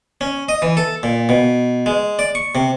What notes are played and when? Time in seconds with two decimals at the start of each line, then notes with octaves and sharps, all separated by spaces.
0.21 C#4
0.49 D#5
0.62 E3
0.77 A4
1.03 A#2
1.29 B2
1.86 G#3
2.19 D5
2.35 C#6
2.55 C3